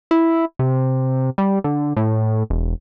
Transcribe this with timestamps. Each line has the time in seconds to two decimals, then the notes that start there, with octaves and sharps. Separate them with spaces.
0.11 E4
0.59 C3
1.38 G3
1.64 D3
1.96 A2
2.50 E1